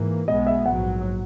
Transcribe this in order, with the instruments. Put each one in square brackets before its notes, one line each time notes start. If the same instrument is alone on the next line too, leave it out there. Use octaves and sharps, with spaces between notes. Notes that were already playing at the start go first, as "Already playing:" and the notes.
Already playing: [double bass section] G#2 E3 A#3
[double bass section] B1 B2 G#3 B3 [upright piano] D#5
[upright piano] E5
[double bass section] A#1 G#2 F#3 [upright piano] F#5